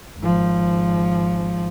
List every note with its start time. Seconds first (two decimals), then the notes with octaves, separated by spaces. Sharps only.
0.20 G#1 F3